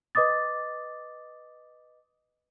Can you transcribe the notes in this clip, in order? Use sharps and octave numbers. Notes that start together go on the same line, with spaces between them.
B4 D#5 D6 D#6 A6